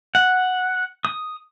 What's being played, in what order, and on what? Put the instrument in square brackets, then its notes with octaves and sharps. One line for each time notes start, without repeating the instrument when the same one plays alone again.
[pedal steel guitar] F#5
D#6